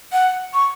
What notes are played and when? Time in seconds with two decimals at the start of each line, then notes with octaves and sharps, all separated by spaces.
0.12 F#5
0.54 C#6